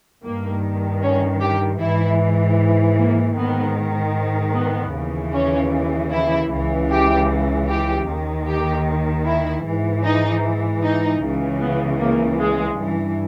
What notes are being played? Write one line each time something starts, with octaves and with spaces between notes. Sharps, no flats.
G2 D#3 A#3
C#4
G4
G#2 E3 E4
A#3
G#2 D#3 B3
B3
D#2 C#3 E3
C#4
E4
C#2 C#3 E3
G4
G4
D#2 D#3
G4
E4
G#2 E3
D#4
D#4
C#2 C#3 E3
B3
A#3
G#3
G2 E3